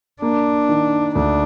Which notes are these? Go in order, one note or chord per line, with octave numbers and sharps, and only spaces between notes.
A#3 D4
D#3
D2 D4